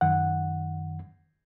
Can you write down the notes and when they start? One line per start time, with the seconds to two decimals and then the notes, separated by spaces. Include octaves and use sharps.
0.01 F#2 D#3 F#5